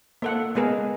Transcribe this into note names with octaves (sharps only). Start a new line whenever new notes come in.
A#3 A4 F#5
G#3 B3 G#4 A#4